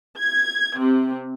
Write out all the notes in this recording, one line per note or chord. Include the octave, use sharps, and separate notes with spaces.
G#6
C3